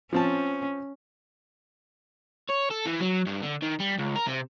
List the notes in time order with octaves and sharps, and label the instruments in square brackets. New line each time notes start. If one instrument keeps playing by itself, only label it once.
[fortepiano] F3 C4 A5 [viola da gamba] C#4
[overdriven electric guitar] C#5
A4
E3
F#3
G2
D3
D#3
G3
C#2
A#4
C3